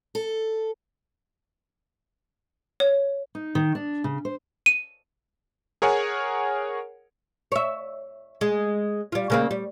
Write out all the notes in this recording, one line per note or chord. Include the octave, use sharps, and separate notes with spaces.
A4
C#5
D#4
D#3
D4
C#3
C5
D#7
G#4 A#4 C#5 F#5 G#5
C#5 E5
G#3
G3 F4
C#3 A#3 C4
G3